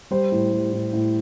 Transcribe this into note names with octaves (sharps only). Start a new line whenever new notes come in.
G3 C5
A2
G3
A2
A2